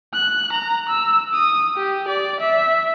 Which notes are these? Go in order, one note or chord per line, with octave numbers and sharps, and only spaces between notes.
F#6
A#5
E6
D#6
G4
D5
E5